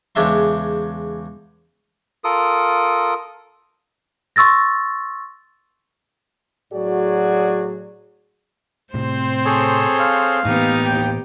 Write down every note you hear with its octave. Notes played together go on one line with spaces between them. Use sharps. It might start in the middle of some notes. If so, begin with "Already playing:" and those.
E2 C#3 G#3 D4 E5 C6
F4 A4 A#4 D#6
C6 C#6 E6 A6 A#6
A2 F#3 F#4 G#4 D5
A2 C3 C4 C5
G#4 A4 C#5
F5
A2 E3 A#3 B3 D#4 G4
D#2 G5